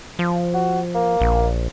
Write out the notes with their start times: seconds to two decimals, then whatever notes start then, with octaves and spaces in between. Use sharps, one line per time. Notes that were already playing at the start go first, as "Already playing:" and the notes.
0.19 F3
0.54 F#4
0.95 A#3
1.21 A#1